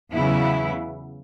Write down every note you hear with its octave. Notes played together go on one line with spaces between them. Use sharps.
E2 C#3 F#3 B3 E4